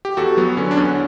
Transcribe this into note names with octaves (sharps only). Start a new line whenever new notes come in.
G4
E2 F#4 A4
F#3 B3
D3 C#4
D4
E2 C#4